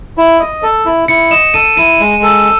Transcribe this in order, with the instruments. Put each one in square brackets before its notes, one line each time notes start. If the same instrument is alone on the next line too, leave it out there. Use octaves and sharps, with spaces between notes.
[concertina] E4
D#5
A4
E4
[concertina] E4 [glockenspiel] C#7
[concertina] D#5 [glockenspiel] E7
[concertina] A4 [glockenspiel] D#7
[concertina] E4 [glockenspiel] D#7
[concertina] G#3
A4